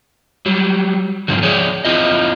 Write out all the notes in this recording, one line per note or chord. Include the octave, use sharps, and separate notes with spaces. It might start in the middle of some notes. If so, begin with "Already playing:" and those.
F#3 G3
G#2 D3 F3 F#3
F3 G#4 C#5 D5
C4 E4 F4 D#5